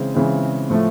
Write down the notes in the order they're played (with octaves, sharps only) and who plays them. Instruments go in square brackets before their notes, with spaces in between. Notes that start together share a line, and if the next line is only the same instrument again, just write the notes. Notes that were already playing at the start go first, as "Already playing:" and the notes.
Already playing: [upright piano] C#3 E3 G#3 C4
C#3 E3 G#3 C4
A2 F3 A3